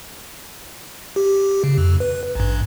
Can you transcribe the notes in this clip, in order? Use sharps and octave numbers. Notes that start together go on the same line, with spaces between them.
G4
C#3
F2
B4
A1 G2